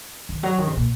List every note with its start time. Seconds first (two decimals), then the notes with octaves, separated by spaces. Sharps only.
0.29 D#3
0.43 F#3
0.58 D#3
0.67 C3
0.77 A#2